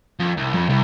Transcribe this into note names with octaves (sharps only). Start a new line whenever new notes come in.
F2
C2
F2
C2